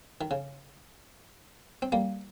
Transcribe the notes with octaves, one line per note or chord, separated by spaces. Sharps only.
D#3
C#3
C4
G3 A#3